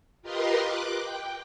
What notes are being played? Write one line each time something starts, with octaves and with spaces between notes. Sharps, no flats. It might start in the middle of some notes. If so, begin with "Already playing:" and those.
F4 G4 A#4 B4 D#5 C6
D6 F#6
G5